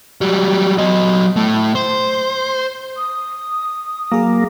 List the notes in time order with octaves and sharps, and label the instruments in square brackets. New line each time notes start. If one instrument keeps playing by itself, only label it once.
[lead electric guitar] F#3 G3
F#3 D#5
A2 A3
C5
[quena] D#6
[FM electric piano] F#3 G#4 [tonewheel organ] A#3